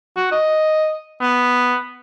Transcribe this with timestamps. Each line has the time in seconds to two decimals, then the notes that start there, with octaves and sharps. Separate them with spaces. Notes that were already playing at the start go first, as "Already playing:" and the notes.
0.17 F#4
0.32 D#5
1.21 B3